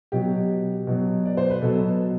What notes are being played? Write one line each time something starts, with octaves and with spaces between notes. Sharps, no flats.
B2 F#3 G4
B2 F#3
D5
C5
B4
B2 F#3 A4